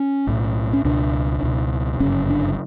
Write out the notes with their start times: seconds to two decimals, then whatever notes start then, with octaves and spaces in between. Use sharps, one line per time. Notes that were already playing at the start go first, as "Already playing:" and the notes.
Already playing: C#4
0.27 B1 A2
0.73 C#4
0.84 C#2 B2 D4
1.43 C#2 B2
2.00 G1 F#2 C#3 C#4
2.30 D4